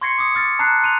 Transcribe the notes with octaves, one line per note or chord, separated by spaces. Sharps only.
C6 C#6 G#6 A#6 C7 C#7
D6 D#6 C#7
D6 F6 A6 A#6 C#7
A5 A#5 F#6 C7
C6 D#7 F7